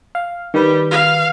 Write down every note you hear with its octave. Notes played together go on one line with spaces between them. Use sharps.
F5
D#3 G3 B4
F5